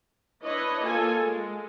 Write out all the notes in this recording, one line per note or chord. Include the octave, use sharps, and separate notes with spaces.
D4 E4 B4 C#5 D#5
A#3 F4 A4 G#5
G#3